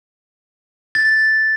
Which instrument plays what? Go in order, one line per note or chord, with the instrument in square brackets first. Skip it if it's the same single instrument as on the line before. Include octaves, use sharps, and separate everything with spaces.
[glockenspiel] A6